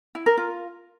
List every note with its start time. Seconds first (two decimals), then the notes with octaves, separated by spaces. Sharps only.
0.15 E4
0.26 A#4
0.37 F4